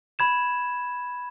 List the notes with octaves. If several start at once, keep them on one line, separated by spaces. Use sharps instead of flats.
B5 G#6 E7